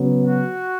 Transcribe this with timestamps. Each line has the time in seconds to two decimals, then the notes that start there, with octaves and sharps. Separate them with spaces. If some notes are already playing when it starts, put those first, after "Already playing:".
Already playing: C#3 F#3 B3
0.24 F#4